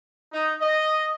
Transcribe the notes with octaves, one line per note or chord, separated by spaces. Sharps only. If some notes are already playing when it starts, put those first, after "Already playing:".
D#4
D#5